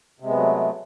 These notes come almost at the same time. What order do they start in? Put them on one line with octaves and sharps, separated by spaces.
C3 G#3 B3 F#3 A3